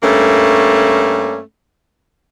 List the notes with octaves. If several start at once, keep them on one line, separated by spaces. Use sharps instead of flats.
G2 A3 A#3 C#4